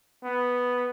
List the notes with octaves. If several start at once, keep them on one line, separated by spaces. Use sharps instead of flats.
B3